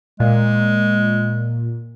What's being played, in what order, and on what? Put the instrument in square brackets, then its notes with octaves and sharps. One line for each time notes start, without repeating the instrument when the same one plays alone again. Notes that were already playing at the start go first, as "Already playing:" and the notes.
[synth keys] A#2 [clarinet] G#3